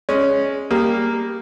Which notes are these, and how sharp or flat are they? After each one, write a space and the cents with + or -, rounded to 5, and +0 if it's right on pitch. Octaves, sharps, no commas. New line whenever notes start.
G#3 +0 C#4 +0
G3 +0 A#3 -5 G#4 -15